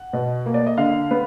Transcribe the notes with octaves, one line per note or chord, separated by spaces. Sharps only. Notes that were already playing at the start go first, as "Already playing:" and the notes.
Already playing: F#5
B2
A#3
D5
D#5
D3 F5
B3